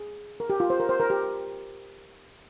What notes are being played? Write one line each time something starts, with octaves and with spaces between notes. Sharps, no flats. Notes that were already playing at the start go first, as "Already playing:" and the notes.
Already playing: G#4
A#4
G4
F4
C5
A#4
C5
A#4
G4